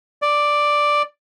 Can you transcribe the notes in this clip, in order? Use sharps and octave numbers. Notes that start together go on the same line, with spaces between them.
D5